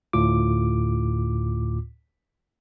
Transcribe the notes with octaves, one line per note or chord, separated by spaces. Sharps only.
D2 A2 F4 D6